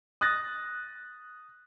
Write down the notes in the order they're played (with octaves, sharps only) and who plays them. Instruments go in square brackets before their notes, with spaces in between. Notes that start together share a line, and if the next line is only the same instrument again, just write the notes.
[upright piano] D#6 F#6 A6 A#6